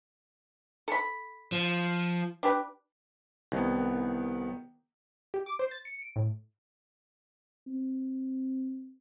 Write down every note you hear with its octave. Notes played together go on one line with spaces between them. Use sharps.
A4 B5
F3
D4 G4 B4
C2 D#3 B3
G4
D6
C5
A6
C#7
D7
A2
C4